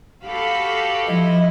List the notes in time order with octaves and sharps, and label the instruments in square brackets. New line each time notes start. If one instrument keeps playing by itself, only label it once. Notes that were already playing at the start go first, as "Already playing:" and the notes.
[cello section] F#4 G4 A4 [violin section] F5 B5
[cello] F3 [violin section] E4 [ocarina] D#5